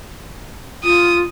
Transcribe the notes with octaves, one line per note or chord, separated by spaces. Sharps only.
F4 D#6